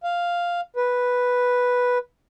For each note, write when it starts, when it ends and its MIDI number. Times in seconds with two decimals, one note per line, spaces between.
0.04 0.61 77
0.76 1.98 71